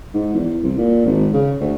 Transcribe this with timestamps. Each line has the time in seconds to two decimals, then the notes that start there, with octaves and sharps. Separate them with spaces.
0.14 G#2
0.34 E2
0.63 C2
0.78 A#2
1.05 G#1
1.33 C#3
1.60 D2